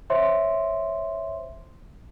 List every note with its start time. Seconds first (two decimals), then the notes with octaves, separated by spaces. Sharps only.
0.10 C5 C#5 E5 C6